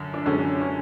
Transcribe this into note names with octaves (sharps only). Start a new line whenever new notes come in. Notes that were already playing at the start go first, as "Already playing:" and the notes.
Already playing: F#2 D3
D4
F#2 D3 G#3 C#4
C#4